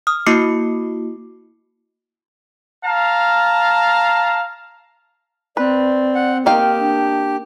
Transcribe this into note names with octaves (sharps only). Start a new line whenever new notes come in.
D#6 F6
A#3 E4 F#4 D6 C7 C#7
F5 A5 A#5
C4 B4 D5
F#5
D#3 A#3 G4 F5 G5
D4